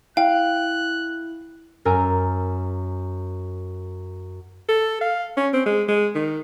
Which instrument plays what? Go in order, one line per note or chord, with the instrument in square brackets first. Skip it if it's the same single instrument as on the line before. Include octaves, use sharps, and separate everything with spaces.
[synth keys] E4 [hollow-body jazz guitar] F5 [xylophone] G5 [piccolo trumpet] F#6
[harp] F#2 A#4 G#5 A#5 E6
[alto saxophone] A4
F5
C#4
C4
G#3
G#3
D#3